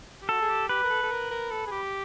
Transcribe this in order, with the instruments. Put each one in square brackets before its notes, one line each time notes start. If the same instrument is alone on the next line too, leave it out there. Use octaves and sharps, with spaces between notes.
[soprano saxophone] G4
[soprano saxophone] F#4 [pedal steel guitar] A4
[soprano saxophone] G#4
G4
[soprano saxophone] G4 [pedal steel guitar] B4
[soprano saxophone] A#4
A4
A4
A#4
A#4
A4
G#4
G4